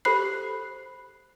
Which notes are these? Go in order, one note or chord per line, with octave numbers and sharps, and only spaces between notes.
G4 A4 C5 B5 F#6 C7